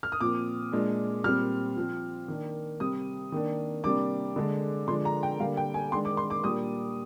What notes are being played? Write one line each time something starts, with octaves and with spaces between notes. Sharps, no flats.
F6
D#6
A#2 F3 C4 D6
A#2 G#3 D4
A#2 G3 C4 F6
F3 C4
D#3 A#3 D4
C3 G3 C4 D#6
D#3 A#3 D4
C3 G3 A#3 D4 D6
D3 G#3 D4
D3 F3 G#3 D4 C6
A#5
G5
D3 G3 A#3 D4 F5
G5
G#5
D#3 G#3 D4 C6
D6
C6
D6
A#2 G3 A#3 D4 D#6